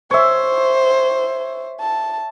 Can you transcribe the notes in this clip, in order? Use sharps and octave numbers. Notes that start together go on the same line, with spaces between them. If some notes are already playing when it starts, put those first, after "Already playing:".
C5 C#5 E5
A5